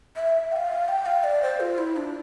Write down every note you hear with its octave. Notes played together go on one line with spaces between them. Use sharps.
E5
G5
F5
G5
F5
D5
C5
F4
E4
D4